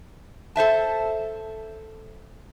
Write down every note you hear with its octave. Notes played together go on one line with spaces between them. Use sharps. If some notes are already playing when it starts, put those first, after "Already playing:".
A4 C5 E5 A5